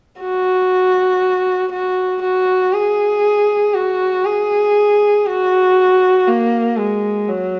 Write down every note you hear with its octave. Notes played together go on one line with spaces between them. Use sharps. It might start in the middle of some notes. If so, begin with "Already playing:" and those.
F#4
F#4
F#4
G#4
F#4
G#4
F#4
A#3
G#3
F#3